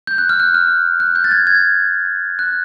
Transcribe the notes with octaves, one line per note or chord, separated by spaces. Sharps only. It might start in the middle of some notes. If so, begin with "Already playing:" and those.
G6
F#6
F6
F#6
F6
F#6
G6
A6
G#6
G#6
F#6